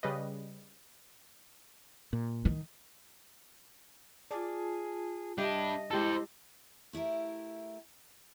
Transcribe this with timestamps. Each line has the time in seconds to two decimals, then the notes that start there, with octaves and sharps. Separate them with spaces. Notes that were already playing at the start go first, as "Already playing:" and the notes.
0.03 C#3 G3 B4 D#5
2.13 A#2
2.45 D#3
4.31 F4 G#4 D5 A5
5.38 G3 D4 G4 D#5 E5 A5
5.91 G#3 E4 G4 A4 C5 A5
6.93 A3 E4 G4 A#4